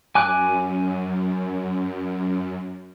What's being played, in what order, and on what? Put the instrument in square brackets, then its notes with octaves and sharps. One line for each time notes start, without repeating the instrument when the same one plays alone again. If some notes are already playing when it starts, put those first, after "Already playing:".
[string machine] F#2 [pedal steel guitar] G#5 D6 F#6